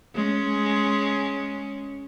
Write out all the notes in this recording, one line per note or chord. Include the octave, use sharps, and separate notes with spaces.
G#3 C#4